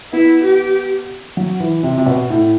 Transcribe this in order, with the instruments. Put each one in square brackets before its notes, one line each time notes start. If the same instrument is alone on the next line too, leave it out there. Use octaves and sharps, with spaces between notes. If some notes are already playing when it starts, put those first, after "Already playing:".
[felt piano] B3 [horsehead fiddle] E4
[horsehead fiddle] G4
[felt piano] F#3
E3
C3
C3
B2
A2